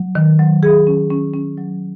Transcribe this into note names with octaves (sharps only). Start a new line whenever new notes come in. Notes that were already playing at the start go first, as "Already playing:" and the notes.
Already playing: F#3
D#3
F#3
G#4
C#4
C#4
C#4
F#3